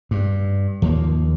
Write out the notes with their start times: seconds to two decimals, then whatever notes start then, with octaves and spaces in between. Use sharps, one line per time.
0.11 G2
0.82 D#2 F3 A#3